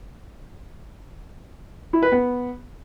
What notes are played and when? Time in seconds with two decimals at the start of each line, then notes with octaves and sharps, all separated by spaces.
1.93 E4
2.03 B4
2.12 B3